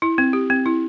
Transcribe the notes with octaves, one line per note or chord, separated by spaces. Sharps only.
E4
C4
G4
C4
E4